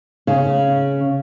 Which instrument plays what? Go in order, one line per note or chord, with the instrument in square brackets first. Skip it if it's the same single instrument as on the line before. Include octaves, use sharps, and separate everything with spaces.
[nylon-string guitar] C#3